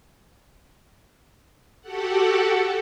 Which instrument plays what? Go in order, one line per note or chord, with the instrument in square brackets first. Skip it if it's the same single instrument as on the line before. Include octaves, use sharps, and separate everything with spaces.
[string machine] F#4 G4 A4 F#5